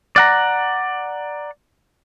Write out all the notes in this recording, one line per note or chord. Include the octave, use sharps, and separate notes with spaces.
D5 F#5 A#5